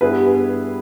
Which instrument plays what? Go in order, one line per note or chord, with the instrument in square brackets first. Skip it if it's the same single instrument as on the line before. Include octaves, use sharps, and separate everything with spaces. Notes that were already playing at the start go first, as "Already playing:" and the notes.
[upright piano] G2 G3 B3 E4 G#4 [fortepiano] B4